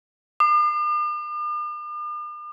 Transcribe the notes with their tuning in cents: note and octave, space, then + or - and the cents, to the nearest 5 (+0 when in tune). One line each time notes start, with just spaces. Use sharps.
D6 +45